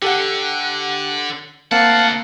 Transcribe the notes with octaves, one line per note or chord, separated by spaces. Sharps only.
D3 G4 A4 F#5
D2 A#3 C4 F5 F#5 A5